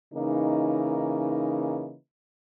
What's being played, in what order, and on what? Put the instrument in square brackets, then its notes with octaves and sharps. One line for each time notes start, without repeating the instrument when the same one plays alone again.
[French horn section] C#3 E3 A#3 D#4